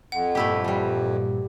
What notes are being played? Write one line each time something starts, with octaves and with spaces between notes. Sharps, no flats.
F2 F#5
G2 A#2 A3 E4 G4
E3 G3